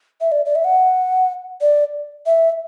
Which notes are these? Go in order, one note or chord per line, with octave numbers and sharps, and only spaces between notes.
E5
D5
D5
E5
F#5
D5
E5